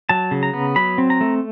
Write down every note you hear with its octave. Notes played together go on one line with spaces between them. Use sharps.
F#3 A5
C#3
A#5
B3
F#3 B5
C4
A#5
A3